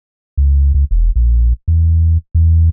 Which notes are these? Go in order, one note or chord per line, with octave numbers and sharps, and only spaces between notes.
C#2
C#2
E1
A#1
E2
E2